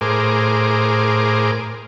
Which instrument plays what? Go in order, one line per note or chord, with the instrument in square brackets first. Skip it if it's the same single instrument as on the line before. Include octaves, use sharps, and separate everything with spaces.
[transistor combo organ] A2 G#4 A#4 C5 D6